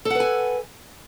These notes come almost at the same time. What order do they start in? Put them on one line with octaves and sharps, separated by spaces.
A4 F#5 B4 G#5